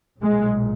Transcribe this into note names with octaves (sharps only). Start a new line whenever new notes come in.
B1 A#2 G#3